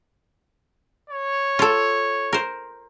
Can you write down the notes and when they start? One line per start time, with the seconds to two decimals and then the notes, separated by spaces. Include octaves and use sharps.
1.10 C#5
1.59 F4 A4
2.33 A#4 C5